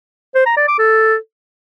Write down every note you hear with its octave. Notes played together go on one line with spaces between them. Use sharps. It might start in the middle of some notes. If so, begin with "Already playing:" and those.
C5
A#5
D5
D6
A4